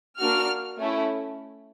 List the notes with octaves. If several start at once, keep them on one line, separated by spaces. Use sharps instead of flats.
A#3 D4 F#4 F6
A3 C#4 E4